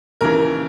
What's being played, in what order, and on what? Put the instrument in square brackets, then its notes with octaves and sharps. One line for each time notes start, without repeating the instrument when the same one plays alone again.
[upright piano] D#2 C#3 E3 A#4